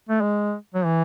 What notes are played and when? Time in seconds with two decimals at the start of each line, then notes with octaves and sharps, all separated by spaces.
0.09 A3
0.21 G#3
0.74 F#3
0.85 E3